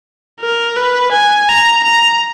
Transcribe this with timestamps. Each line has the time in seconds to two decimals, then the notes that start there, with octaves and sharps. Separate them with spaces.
0.40 A#4
0.77 B4
1.12 G#5
1.48 A#5
1.84 A#5